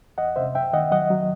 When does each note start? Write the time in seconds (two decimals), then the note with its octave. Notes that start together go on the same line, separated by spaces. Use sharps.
0.18 E2 D#5 F#5
0.36 C3 C5 E5
0.55 F#2 E5 G5
0.73 D#3 D#5 F#5
0.91 F#3 D#5 F#5
1.10 F#3